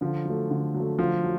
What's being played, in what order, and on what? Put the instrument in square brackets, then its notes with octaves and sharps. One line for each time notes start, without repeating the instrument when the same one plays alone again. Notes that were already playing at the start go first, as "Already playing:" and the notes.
[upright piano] D3 [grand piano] F3
[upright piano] F#3 A3
D3
F#3
A3
[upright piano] D3 [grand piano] F3
[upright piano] F#3